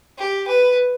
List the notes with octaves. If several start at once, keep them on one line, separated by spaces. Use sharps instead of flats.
G4
B4